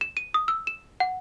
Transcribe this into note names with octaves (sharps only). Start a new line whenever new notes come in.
E7
D#7
D#6
E6
E7
F#5